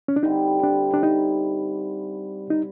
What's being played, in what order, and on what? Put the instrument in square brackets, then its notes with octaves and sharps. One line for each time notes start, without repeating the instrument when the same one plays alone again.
[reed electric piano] C#4
D4
[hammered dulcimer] D3 G3 C4 E4 [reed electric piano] D#4
[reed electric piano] D4
D4
D#4
D#4